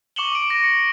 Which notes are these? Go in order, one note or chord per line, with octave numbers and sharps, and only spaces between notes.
C#6 D6 C#7 E7 F#7 G7
D6 D7
A#6
C#7